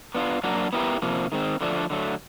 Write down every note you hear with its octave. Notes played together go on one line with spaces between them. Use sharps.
B3 D4 F4
F#3 A#3 D4 F#4
B3 E4 G4 A#4
C3 F3 A#3
D#3 G#3 C4
D3 F3 A3 D4
D3 F#3 A3